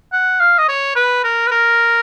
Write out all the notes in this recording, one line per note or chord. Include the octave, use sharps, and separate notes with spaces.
F#5
F5
D#5
C#5
B4
A#4
B4
A#4